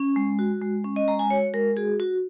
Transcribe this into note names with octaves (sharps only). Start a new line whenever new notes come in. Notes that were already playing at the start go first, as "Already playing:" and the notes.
Already playing: C#4
G#3
F#4
G#3
C#4
D#5
G#3 A#5
G#5
F#4 C#5
G#3 A#4
F#4 G#4
F#4